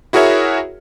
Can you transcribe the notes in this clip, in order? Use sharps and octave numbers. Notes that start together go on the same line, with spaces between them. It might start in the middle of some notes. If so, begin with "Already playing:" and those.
E4 F#4 G#4 A#4 C#5 E5